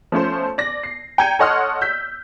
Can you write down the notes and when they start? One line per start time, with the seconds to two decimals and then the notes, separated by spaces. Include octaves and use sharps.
0.12 F3 A3 C#4 C5
0.58 D5 A#6
0.83 C7
1.18 G5 A#5 G6 G#6 C#7 D#7
1.39 A4 C#5 D#5 F#5 C6 F6
1.81 E6 G6 B6